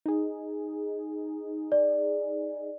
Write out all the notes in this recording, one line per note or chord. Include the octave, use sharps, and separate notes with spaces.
D#4 G#4
D5